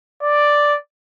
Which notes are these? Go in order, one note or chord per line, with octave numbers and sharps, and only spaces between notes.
D5